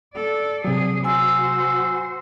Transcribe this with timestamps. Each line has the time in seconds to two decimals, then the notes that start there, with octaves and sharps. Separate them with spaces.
0.14 A4 D5
0.65 C3 F#3 G#4
1.04 F#4 C5 G#5 E6